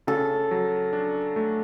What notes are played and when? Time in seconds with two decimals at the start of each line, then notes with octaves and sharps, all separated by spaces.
0.07 C#3 A4
0.51 F#3
0.93 D4
1.36 A3